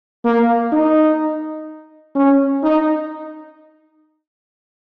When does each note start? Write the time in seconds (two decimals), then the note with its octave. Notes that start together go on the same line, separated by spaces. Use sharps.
0.25 A#3
0.72 D#4
2.16 C#4
2.63 D#4